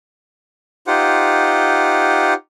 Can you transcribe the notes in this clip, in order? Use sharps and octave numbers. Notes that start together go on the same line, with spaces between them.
D#4 F4 G4 C5 F#5